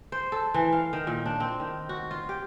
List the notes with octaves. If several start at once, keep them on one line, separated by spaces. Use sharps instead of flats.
C5
A4
E3
F5
D#3
A#2
D4
C4
D#3
F#4
F4
G4